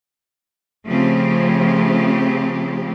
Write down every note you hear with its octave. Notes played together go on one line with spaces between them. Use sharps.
C#3 F3 A3 C4 G4